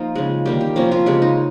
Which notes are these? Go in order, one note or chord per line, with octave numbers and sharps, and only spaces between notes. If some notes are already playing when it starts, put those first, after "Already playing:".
Already playing: F3 A#3 D#4 F4
C#3 G#3
D#3 G3 A#3 G4
G4
C3 F3 A#3 C#4
F4
C#3 G#3 G4
D#4